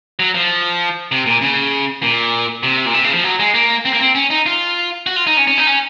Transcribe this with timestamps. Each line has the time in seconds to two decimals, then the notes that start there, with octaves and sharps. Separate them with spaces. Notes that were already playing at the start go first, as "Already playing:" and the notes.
0.19 F#3
0.35 F3
1.12 C3
1.26 A#2
1.41 C#3
2.02 A#2
2.63 C3
2.85 A#2
2.94 C3
3.04 C#3
3.14 F3
3.24 F#3
3.39 G#3
3.54 A#3
3.85 C4
3.93 A#3
3.99 C4
4.15 C#4
4.30 D#4
4.46 F4
5.06 F#4
5.16 F4
5.27 D#4
5.37 C#4
5.47 C#4
5.57 D#4
5.67 C#4